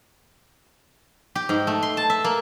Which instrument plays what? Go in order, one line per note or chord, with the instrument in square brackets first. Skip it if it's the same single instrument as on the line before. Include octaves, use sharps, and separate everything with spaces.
[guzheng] G4
G#2
A3
C6
A5
E5
A#3